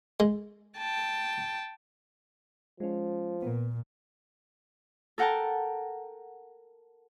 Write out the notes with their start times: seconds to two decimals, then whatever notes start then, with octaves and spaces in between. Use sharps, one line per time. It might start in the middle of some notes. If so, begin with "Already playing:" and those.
0.20 G#3
0.77 G5 A5
2.80 F3 G#3 C#4
3.42 A#2 A#3 B3
5.18 A4 A#4 F#5 G5 A5 A#5